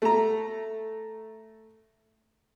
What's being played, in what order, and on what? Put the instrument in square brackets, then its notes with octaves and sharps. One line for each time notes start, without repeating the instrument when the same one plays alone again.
[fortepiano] A3 A#5